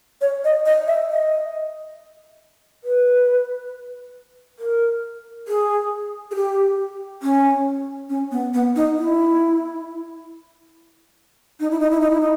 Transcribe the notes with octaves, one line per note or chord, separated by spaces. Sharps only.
C#5
D#5
D#5
E5
D#5
B4
A#4
G#4
G#4
G4
C#4
C#4
B3
B3
D#4
E4
D#4
E4
D#4
E4
D#4
E4
D#4